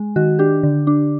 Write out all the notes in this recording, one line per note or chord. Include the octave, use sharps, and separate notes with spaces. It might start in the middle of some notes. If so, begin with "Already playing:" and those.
Already playing: G#3
D#3 F#4
D4 G4
D3
D4